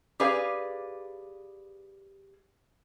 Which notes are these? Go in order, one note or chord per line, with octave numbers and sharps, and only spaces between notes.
G4 G#4 B4 D5 F5